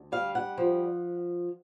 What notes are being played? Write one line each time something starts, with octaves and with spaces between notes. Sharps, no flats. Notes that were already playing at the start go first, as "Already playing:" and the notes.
Already playing: D2
G3 F5
F#5
F3